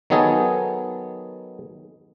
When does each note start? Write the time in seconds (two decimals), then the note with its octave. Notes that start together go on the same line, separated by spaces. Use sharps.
0.10 D#3 F#3 B3 D#4 G#4 A4